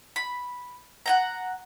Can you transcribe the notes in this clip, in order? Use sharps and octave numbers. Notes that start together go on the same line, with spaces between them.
B5
F#5 G5 A#5